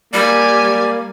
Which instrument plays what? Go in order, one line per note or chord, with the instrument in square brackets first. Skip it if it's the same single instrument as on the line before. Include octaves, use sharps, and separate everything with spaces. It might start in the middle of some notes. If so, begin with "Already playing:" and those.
[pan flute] G3 [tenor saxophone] A#3 [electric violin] G4 G#5 [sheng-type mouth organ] D5